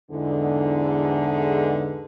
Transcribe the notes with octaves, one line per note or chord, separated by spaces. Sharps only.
E2 G#2 D3